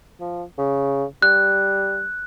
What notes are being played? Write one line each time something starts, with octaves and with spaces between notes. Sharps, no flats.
F3
C#3
G3 F#6